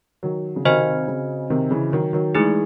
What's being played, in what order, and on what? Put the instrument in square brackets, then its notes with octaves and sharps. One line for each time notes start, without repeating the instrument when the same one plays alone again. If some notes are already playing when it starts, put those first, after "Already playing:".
[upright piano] D#3 F#3
C#3
[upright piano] C3 D#3 [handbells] C4 F#4 C5 D#5 G#5
[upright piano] C#3
C3 D#3
C#3 E3
D#3 F#3
D#3 F#3
[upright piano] E3 G#3 [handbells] A3 D#4 G#4